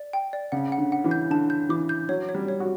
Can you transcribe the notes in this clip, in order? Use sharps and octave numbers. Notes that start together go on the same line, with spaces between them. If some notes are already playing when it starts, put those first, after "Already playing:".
Already playing: D5
G5
D5
C#3 F#5
F#5
D3
F#5
E3
G6
D3 A5
G6
E3 D6
G6
F#3 C#5
C#5
G3
C#5
F#4